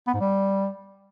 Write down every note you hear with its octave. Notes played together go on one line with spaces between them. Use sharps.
B3
G#2
G3